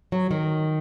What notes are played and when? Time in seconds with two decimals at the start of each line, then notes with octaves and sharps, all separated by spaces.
0.12 F#3
0.31 D#3